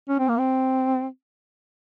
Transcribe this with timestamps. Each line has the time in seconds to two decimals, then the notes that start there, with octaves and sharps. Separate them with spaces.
0.09 C#4
0.19 C4
0.28 A#3
0.39 C4